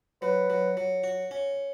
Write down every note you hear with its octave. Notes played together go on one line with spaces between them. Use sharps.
F#3 B4
F#3
F#3
F#4
C#4